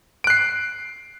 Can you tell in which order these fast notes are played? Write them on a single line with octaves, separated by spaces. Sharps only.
D7 F#6 C7